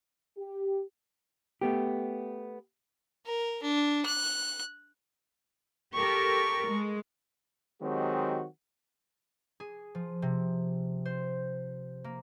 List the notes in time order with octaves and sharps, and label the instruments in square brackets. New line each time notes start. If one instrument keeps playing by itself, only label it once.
[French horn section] G4
[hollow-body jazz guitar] A3 B3 G4
[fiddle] A#4
D4
F#6
[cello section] G4 A4 A#4 [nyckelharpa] C#6
[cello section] G#3
[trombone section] D#3 F#3 G#3 C4 F#4 G4
[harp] G#4
F3
C3
C5
A#3